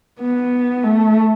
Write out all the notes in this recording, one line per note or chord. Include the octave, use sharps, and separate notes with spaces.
B3
A3